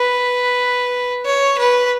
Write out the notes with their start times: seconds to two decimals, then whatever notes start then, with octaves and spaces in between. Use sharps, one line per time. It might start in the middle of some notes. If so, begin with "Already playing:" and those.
Already playing: B4
1.25 C#5
1.58 B4